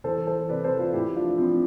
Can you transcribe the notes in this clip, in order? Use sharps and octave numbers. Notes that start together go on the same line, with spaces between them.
E3 A4 C5
E3 A4 C5
C3 B4 D5
A4 C5
E3
F4 A4
A2 E4 G4
F3 D4 F4
F3 C4 E4